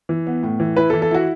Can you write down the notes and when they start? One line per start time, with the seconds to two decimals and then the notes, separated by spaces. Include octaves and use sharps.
0.09 E3
0.27 B3
0.43 A2
0.60 E3
0.76 E4 B4
0.90 A4
0.93 E3
1.02 A4
1.11 E4 F#4